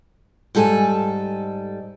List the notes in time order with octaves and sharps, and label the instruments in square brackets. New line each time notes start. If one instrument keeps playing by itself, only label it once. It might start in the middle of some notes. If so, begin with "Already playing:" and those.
[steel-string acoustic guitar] G#2 G3 A4 B4 G#5